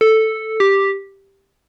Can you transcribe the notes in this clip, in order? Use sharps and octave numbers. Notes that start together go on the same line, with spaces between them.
A4
G4